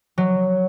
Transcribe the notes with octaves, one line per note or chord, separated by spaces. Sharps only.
F#3